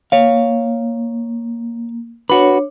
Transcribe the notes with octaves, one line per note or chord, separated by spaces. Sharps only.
A#3 C#5 F5
D4 F#4 B4 C#5